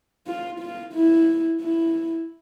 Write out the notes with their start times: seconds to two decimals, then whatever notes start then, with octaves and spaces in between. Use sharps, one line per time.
0.27 F4
0.60 F4
0.94 E4
1.61 E4